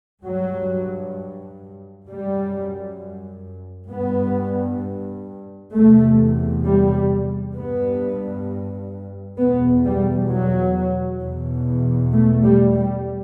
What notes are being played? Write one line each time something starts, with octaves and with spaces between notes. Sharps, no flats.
G2 F#3
F#2 G3
G2 B3
E2 C3 A3
G3
G2 B3
E2 B2 B3
G3
F#3
E2 B2
A3
G3
G3